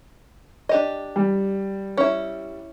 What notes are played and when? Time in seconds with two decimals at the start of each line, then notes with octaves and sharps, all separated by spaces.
0.69 D4 G4 D#5
1.16 G3
1.98 C#4 E4